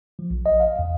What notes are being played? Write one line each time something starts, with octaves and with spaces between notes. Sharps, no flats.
F3
A#1
D#5
F5
E2